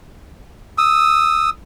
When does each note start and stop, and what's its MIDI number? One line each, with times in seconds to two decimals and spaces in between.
0.78 1.50 87
0.78 1.50 88